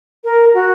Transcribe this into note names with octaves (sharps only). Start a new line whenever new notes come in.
A#4
F#4